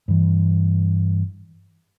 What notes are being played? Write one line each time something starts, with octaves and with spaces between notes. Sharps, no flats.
G2 E3